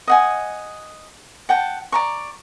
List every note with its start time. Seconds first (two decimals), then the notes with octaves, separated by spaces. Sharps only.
0.07 D#5 F#5 G#5
1.49 F#5 G5 A5
1.92 D5 A#5 C#6